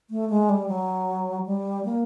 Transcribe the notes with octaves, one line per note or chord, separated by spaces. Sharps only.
A3
G#3
G3
F#3
G3
A#3